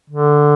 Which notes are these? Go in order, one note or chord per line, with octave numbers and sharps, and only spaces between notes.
D3